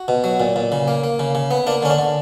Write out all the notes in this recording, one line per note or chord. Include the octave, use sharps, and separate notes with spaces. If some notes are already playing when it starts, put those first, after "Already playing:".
Already playing: F#4
B2
F#3
A#2
A#2
C#3
A#3
A#3
C#3
C#3
B3
A#3 D4
D3 C#4
D4
D3